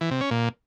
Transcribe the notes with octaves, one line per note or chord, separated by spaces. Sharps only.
E3
C3
C#4
A#2